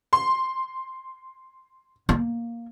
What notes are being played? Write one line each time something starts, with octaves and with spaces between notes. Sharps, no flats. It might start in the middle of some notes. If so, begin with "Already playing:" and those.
C6
A#3